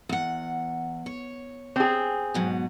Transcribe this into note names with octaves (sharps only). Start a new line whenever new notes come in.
E2 F#5
C#5
C4 G#4
G#2 B2 F#3